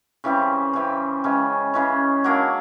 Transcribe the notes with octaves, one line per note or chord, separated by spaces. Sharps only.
C#3 E3 G3 C4
C#3 E3 G3 C4
C#3 E3 G#3 C#4
C#3 E3 G#3 C#4
F#3 A#3 D4